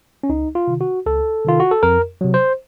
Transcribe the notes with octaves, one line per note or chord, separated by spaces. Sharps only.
C#4
C#2 D#4
F4
C3 D#3
F#4
C#2 A4
C3 D#3 F4
F#4
A4
F2 A#4
C3 F#3
C5